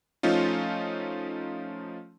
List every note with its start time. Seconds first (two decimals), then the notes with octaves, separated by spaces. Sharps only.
0.23 F3 A3 C#4 D#4 F4